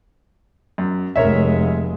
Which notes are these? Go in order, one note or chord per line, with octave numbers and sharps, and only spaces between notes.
F#2
F1 G#3 A#4 C#5 E5